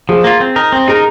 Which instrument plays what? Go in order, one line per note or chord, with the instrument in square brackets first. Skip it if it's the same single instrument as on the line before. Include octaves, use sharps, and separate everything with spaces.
[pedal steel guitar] F3 [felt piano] G#4
[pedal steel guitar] A#3 F4
C4
D#4 A#4
C4
[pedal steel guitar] D#4 A#4 [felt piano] G#4